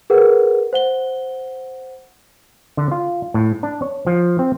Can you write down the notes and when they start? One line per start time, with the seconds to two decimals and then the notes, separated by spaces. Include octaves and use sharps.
0.10 G#4 A#4 B4 F#5
0.73 C5 F#5 G7
2.77 D3
2.92 F4
3.34 A2
3.63 D4
3.82 C#5
4.07 F3
4.39 C4